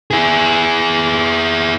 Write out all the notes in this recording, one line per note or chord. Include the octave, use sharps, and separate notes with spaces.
E4 G#4